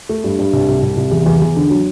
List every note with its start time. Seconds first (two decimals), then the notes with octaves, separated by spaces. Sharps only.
0.09 A3
0.24 G2
0.38 G2
0.53 C2
0.68 C2
0.82 C2
0.97 C2
1.11 E2
1.26 E2
1.41 E2
1.57 D3
1.70 F#3